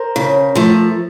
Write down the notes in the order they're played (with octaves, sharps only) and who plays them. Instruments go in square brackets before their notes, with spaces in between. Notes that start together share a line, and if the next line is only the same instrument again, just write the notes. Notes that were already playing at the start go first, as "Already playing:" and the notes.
Already playing: [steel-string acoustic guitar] A#4 C5
C#3
F3 A3